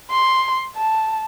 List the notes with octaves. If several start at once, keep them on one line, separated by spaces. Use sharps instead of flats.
C6
A5